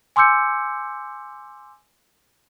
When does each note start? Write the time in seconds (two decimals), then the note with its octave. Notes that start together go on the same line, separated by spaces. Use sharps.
0.16 G#5 C6 D6 E6 G6 C#7